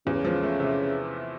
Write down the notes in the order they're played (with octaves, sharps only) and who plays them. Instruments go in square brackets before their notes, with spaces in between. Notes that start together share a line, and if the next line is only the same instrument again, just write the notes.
[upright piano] E2 [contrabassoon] C#3
[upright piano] F3
A3
C3